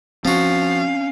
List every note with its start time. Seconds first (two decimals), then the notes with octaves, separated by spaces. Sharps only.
0.25 F3 C4 C#4 F#4 F5